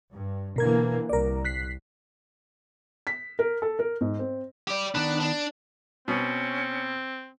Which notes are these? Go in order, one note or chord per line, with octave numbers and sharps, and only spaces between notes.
G2
B2 D3 E3 A#3 A#4 G#6
C2 A#4 D5
F#6 B6 C7
B6
A#4
A4
A#4
G#2
C4
G4 D5
D#3 B3 D4 B4
D4
B2 C4 C#4